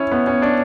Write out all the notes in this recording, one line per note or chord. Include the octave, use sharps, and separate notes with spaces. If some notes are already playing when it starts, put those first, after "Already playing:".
Already playing: C#4 E4
B3
C#4
D4